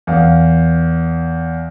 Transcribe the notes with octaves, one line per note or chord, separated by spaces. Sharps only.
E2 F5